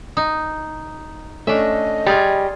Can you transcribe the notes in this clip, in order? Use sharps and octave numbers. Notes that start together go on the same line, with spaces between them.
D#4
A3 C#4 D4 D#5 E5
G3 F4 G#4 C#5